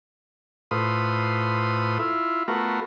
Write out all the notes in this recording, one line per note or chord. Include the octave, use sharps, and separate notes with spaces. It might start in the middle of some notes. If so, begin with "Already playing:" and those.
A2 F4 B4 C5 D#6
E4 F4
A3 B3 F4 F#4 A#4